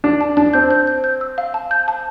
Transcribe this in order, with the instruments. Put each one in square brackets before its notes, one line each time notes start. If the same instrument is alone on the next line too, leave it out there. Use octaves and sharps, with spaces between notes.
[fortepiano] D4 [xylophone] A5
[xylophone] A5
[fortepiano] D4 [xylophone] A5
[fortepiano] C4 [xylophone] G6
[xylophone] G6
G6
G6
E6
F5
A5
G6
A5